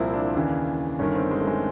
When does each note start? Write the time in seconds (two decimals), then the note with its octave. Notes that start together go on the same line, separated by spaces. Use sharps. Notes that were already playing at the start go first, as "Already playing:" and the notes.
Already playing: C2 A#2 F3 C4 E4
0.13 D4
0.35 D#2 C#3 E3
0.99 G1 G2 D#3 C#4
1.15 C4
1.31 G#3
1.41 A3
1.47 G#3